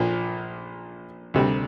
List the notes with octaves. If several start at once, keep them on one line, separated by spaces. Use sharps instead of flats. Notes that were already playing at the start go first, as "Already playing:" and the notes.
Already playing: A#1 A#2 F3
D2 C3 G3